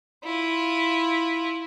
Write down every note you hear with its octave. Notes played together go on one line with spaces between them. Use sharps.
E4 F4